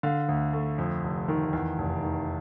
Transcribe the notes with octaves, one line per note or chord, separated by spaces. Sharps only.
D3 F5
D2
A3
F2
F1
D#3
E2
F1
D#3